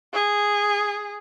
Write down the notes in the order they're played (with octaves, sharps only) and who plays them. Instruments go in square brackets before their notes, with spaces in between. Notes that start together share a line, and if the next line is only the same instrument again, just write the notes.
[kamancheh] G#4